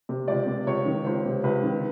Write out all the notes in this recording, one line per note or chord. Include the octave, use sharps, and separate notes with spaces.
C3
C#2 D5
C3
C#2 C#5
D#3
C#2 C5
C3
C#2 B4
D#3